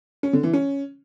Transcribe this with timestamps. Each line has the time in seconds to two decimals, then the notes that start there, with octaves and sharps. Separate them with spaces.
0.23 C#4
0.33 D3
0.43 E3
0.53 C#4